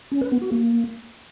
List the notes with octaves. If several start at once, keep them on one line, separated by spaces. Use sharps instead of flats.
C#4
B4
B3
F#4
A#3